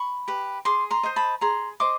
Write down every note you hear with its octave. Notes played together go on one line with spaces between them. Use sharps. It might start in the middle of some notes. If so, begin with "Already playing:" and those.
Already playing: B5 C#6
G4 B4
G#4 C6 D6
A#5 C6
C5 D#5
A5 B5
G#4 A#5 C6
C5 D#5 C6 D6